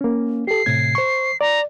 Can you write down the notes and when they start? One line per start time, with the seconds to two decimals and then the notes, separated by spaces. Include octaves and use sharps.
0.01 A#3 C#4
0.47 G4 A4 C7
0.66 A2 C3 G#6
0.95 C5 C#6
1.41 D5 A#5